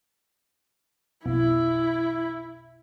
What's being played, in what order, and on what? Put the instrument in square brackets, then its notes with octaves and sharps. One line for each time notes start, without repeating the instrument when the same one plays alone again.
[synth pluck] B1 F2 B2 [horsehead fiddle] E4